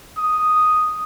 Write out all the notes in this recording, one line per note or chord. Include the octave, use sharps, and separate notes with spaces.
D#6